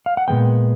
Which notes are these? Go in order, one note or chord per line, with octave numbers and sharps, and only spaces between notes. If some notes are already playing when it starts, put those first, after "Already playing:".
F5
F#5
A#2 F3 G#3 B3 G5